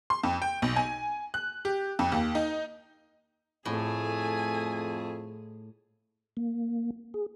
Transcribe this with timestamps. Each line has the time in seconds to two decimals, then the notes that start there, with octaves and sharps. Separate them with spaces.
0.10 C6
0.23 F2
0.42 G5
0.62 B1
0.76 G#5
1.34 F#6
1.65 G4
1.99 F2
2.12 D#2
2.35 D#4
3.65 F2 A2 A3 G#4 G#5
6.37 A#3
7.14 G#4